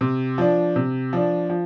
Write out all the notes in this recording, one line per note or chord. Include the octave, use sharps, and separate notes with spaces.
C3
F3 D4
C3
F3 D4
F3